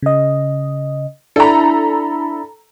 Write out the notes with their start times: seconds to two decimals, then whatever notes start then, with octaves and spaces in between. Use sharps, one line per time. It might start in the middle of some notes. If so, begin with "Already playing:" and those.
0.02 C#3 D#5
1.36 D4 E4 A4 A#5 B5